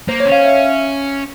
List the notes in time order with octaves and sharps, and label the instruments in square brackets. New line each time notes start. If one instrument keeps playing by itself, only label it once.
[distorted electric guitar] A#3 [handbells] C5
[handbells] C#5
[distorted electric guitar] C#4
[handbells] F5
E5